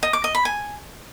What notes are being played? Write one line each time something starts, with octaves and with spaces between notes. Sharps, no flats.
D#5
D6
D#5
B5
G#5